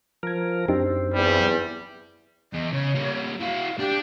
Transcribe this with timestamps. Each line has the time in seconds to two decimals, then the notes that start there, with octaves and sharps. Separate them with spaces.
0.23 F3 A#4 F6 G#6
0.68 F#2 C4 D4 D#4 G4
1.14 E2 G3
2.53 E2 D#5
2.72 C#3 C#5
2.95 G3 A#3
3.41 E4 F#4 F5
3.79 D4 G4